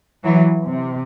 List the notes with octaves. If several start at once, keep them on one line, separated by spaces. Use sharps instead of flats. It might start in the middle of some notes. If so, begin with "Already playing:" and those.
E3 F#3
C3